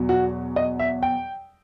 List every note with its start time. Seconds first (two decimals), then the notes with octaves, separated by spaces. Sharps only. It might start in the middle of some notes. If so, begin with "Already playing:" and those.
Already playing: E2 B2 F#3
0.09 F#4
0.56 D#5
0.79 E5
1.03 G5